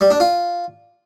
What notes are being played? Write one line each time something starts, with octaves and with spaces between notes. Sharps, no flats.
G3
D4
F4